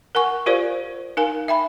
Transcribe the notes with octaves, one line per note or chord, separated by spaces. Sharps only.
A#4 F#5 G#5 C#6
F4 G4 A#4 C5 D5 F5
D#4 A#4 F5 G#5
E5 G5 B5